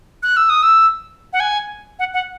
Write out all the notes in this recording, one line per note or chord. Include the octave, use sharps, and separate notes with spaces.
F#6
E6
D#6
E6
F#5
G#5
F#5
F#5